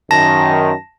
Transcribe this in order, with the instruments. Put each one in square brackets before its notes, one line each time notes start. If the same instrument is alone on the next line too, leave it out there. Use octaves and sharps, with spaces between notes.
[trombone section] F#2 D#3 [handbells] A5 A#6